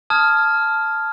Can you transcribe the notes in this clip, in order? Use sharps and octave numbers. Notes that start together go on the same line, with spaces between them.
A5 D#6 F6 G#6